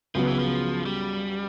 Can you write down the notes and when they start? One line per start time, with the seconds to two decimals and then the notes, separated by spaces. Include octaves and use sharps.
0.15 C#2 C#3 F3 F#3 B3
0.27 E3
0.39 F3
0.86 G3